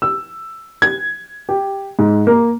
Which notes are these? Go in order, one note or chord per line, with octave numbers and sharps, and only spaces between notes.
E6
G#6
G4
G#2
A#3